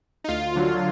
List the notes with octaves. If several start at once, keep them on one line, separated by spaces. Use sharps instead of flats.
D#4
D2 F4
D3 F#3